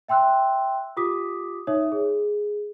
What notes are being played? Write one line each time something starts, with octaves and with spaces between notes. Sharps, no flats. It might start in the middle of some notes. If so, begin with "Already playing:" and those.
E5 G5 C6 E6 F#6
F4 G4 D6 D#6 B6
D#4 C#5 E5 D#6
G#4